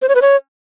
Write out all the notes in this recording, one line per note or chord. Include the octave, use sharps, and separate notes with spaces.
C5
C#5
B4
C#5